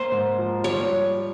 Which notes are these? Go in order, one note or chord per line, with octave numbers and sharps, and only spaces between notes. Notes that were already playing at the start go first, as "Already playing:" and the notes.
Already playing: A#3 C5
G#2
F3
G3 C#5